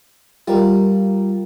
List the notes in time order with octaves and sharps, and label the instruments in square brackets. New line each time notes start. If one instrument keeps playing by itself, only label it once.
[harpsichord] G3 [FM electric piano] F4 A#4